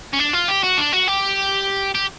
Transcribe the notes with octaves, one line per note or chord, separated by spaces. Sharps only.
C#4
D4
F4
G4
F#4
D4
F#4
G4
G4